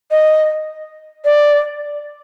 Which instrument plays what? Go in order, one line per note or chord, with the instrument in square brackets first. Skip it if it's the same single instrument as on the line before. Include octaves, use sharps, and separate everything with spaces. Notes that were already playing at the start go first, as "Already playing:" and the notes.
[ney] D#5
D5